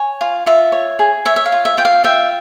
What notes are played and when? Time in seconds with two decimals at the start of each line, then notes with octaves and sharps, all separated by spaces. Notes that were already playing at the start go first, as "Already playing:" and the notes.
Already playing: C#5 G#5
0.21 F4
0.46 F4 E5
0.72 C#5
0.99 G#4
1.25 C#5 E5
1.36 E5
1.46 F5
1.52 F4
1.65 E5
1.77 F4 G5
1.85 F5
2.04 F4 E5 G5